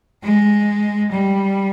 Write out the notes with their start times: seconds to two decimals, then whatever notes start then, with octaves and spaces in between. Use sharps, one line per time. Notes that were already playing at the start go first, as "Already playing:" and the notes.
0.24 G#3
1.11 G3